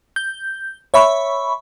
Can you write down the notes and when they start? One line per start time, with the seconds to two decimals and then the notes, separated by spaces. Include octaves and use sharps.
0.16 G6
0.94 C#5 E5 B5 C#6